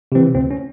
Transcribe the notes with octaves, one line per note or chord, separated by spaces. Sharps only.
C3 E3 C4
D2 C4
C#4